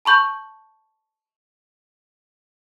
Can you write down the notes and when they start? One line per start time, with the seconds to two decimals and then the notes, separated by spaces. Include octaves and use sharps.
0.05 A5 B5 C#6 G6